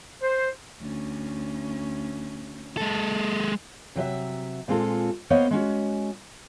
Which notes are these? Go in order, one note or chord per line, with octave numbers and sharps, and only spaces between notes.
C5
D2 C#4
G#3 A4
C3 F#3 D#5 E5
A#2 G#3 C4 F4 A4
A#3 B3 C5 C#5 D#5 F5
G#3 C#4 F#4